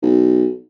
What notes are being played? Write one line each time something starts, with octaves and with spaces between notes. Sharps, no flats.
B1